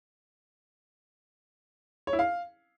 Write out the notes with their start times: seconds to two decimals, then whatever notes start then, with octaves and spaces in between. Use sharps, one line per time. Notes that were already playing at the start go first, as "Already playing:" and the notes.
2.07 C#5
2.13 E4
2.19 F5